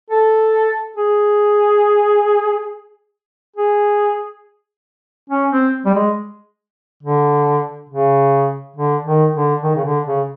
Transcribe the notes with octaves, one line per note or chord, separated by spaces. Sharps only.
A4
G#4
G#4
C#4
C4
G3
G#3
D3
C#3
D3
D#3
D3
D#3
C#3
D3
C#3